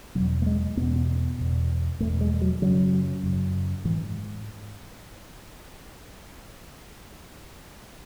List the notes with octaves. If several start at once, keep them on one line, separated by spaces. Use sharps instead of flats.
E2 B2 F#3
A3
G#3
E2 B2 B3
E2 B2
E2 B2 A3
G#3
F#3
F#2 C#3 F#3
F#2 C#3
G#2 E3